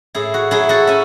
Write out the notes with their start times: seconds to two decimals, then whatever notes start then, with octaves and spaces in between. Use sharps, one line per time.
0.15 A2 E4 G#4
0.34 F#4
0.51 F#3 E4 G#4
0.69 F#4 A4
0.87 C#4 E5 G#5